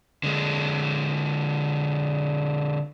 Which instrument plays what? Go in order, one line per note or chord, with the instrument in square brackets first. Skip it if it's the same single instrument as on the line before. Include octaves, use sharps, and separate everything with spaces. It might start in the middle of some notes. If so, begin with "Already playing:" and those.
[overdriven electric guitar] D3 G#3